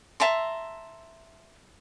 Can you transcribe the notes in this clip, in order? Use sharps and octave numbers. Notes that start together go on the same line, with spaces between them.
E5 A5 A#5 C6